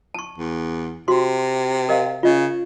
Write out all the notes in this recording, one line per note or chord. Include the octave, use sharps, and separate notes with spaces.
A5 C#6
E2
C3 F#4 C6
A#4 D#5 F5
C#3 F4 D#5